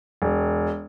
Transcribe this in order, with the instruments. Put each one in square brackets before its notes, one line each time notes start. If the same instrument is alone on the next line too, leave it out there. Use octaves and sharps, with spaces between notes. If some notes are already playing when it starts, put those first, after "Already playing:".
[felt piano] E1